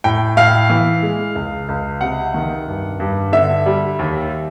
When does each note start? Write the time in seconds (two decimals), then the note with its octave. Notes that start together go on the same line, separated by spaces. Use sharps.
0.04 A2 G5
0.37 A2 F5
0.70 E3
1.02 G#3
1.35 C#2
1.69 C#2
2.01 C3 F#5
2.34 D#3
2.67 G2
3.00 G2
3.32 D3 E5
3.66 G3
3.99 D#2